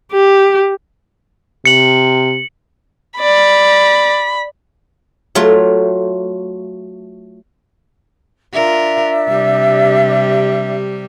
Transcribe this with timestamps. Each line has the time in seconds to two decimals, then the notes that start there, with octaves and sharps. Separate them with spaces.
0.12 G4
1.65 C3 C#7 F#7
3.20 D5 B5
5.35 F#3 A3 F4
8.53 D4 F4 A#4 E5
9.29 C3 G3